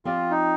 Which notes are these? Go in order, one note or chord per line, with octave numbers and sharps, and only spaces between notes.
F3 C4 F4 G4 D5
D#4